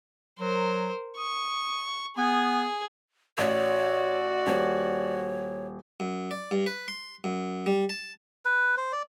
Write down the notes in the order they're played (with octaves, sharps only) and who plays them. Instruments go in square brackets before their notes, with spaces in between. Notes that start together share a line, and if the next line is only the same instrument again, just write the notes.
[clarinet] F#3 [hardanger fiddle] A#4 C5
[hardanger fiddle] C#6 [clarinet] D#6
[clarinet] B3 [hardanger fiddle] G#4 G#5
[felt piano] A1 [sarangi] F#4 [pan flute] C#5 [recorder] D5
[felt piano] D#1 [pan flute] C#5
[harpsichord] F#2
D5
G2
B4
C6
F#2
G3
A5
[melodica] B4
C5
D5